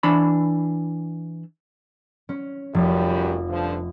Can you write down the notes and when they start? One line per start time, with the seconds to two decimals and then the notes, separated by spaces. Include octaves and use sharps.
0.03 E3 D4 B5
2.29 C#4
2.74 F1 F#2 G3
3.49 G2 D3 F3